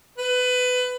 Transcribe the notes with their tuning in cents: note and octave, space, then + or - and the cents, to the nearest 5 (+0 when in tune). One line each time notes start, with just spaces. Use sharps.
B4 +20